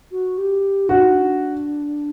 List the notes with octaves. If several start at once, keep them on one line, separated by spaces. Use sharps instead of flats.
F#4
G4
D4 F#4
D#4
D4